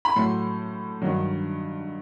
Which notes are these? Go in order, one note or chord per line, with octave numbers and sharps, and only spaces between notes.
B5
A2 F#3 C6
G2 D#3 F#3